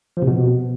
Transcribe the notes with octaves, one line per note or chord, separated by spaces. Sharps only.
F3
C3
B2